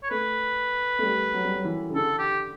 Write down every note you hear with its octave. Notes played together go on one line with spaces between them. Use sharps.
C#5
A3 B4
A3
G3
F#3
G3
F#3
E3
C#3
D3 A4
G4